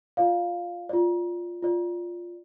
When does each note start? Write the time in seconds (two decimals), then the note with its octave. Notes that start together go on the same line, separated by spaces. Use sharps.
0.17 F4 D5 F5
0.89 F4 D5
1.63 F4 D5